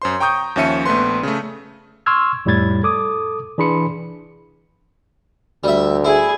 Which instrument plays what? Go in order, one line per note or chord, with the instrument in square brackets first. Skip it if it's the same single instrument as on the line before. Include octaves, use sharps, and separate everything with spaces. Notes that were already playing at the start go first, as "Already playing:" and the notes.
[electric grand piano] F#2 C5 C6
G5 A#5 C#6 D#6 G6
D#2 F3 C#4 E5 C#7 D#7
A#1 A3 B3 B4 C6
C#3 A3
[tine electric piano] C6 C#6 E6 F6 G#6
F2 A2 G3 B5 G#6 A6
A4 D6 D#6
E3 D4 G#4 B5 C6 C#7
[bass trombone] D2 [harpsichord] G3 E5
[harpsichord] E4 [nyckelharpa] G#4 G#5